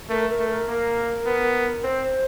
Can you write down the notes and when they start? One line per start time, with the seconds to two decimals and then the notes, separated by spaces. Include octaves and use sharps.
0.09 A3 A#4
0.29 A#4
0.39 A3
0.48 A#4
0.68 A#3
1.26 B3
1.83 C4 C5